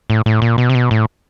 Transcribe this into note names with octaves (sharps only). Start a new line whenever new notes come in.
A2
A2
A#2
B2
C3
B2
A2